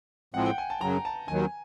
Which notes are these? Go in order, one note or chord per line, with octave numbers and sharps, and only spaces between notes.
A2 F3 G#3 C4 F#5
G5
G#5
A5
F#2 C#3 F#3 A#5
A5
D#2 D#3 F#3 G#5